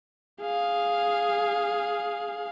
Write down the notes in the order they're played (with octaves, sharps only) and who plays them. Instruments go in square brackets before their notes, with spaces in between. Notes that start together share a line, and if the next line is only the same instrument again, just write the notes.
[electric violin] G#4 F5